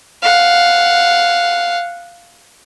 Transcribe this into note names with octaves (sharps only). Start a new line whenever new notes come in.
F5 F#5